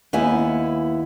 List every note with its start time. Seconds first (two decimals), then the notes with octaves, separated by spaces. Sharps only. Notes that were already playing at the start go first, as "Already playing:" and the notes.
0.13 D#2 B3 E4 G#5